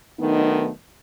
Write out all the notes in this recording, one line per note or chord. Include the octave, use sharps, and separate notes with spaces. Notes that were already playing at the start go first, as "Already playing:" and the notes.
D#3 F#3 A3 B3 D4 D#4